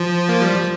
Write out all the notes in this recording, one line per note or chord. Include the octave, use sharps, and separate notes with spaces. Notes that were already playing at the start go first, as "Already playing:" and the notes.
Already playing: F3
A#3
G3
F3